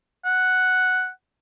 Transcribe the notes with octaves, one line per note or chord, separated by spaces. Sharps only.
F#5